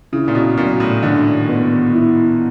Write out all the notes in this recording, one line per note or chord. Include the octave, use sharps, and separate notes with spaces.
C#3 E4
A#2
B2
A#2 F#3
A2
D3 D#3
B3
E4